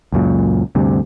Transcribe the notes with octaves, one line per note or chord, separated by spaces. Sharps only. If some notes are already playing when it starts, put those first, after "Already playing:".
C#2 F#2 A#2
D2 G2 C3